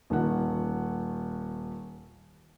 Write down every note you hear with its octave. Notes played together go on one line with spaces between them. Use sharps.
D#1 D#3 F#5